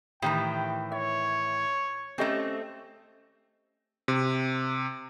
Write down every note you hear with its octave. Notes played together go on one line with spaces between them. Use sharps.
A2 D#3 E3 G4 G5
C#5 E5
A3 C4 C#4 G4 D#5
C3